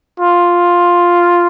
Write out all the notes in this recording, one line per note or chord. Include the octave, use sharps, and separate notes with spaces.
F4